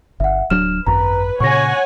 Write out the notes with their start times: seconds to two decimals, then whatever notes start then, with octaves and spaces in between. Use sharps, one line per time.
0.20 G1 E5 F#5
0.50 D1 F#3 D4 F6 E7
0.87 G#1 F#2 B4 A#5
1.40 A#2 C#3 C#5 F#5 G#5 C#6 A#6